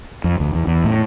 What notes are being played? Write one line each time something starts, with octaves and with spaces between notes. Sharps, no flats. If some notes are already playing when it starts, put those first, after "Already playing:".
F2
D2
E2
E2
A2